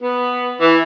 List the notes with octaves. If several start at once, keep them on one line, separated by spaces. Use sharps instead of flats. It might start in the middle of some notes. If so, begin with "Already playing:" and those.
B3
E3